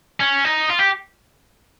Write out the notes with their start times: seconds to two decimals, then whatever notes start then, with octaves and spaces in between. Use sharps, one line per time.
0.20 C#4
0.45 D#4
0.70 F4
0.79 G4